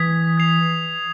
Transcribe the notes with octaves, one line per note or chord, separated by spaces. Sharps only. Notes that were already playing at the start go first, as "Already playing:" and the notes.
Already playing: E3 D#6 G#6 B6
G#6 C7 F7